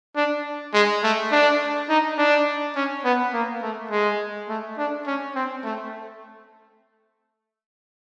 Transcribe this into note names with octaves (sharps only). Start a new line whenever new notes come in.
D4
G#3
A3
D4
D#4
D4
C#4
B3
A#3
A3
G#3
A3
D4
C#4
C4
A3